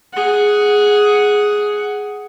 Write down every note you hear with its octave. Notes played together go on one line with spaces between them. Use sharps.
G#4 F#5